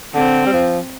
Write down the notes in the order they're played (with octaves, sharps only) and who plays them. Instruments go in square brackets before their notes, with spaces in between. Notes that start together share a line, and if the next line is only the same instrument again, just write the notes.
[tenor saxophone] D3 [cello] C4
[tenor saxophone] G3
F3